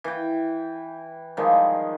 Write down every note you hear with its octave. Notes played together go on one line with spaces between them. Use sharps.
E3 G5
D#3 F3 G3 G#3